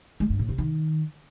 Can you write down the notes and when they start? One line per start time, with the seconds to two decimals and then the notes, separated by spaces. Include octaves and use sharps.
0.20 G#3
0.30 G2
0.39 A2
0.49 C3
0.58 D#3